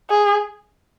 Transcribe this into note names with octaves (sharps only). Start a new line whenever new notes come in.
G#4